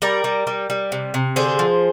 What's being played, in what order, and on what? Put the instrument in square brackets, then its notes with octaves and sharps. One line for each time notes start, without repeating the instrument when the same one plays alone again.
[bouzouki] G3 A#4 D5
G3
G3
G3
C3
C3
D3 G#4 C5
F3